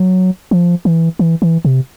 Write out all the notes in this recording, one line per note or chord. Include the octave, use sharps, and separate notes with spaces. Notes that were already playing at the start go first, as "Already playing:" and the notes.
Already playing: F#3
F3
E3
E3
E3
C3